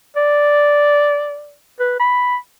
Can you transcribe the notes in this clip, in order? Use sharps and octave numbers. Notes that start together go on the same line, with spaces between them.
D5
B4
B5